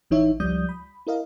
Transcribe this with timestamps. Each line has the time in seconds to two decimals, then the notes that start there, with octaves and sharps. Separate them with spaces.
0.10 A1 E3 D#4 C#5 E5
0.40 C#2 F3 G3 D5 D#6 G6
0.69 B5
1.07 E4 A#4 D#5 F5